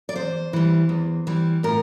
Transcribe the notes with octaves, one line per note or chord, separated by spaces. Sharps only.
D5
E2 C5
E3 G3
E2
E3 G3
A2 A#4